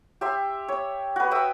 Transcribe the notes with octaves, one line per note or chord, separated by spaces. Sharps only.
G4 E5 C6
C#5
F#4 B4
E5 G5 D#6 E6